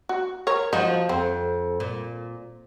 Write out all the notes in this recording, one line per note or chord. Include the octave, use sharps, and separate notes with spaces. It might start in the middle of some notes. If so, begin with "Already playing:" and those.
F#4
A#4 C#5
F3 D#4 F#4 D#5
F2 C4
A#2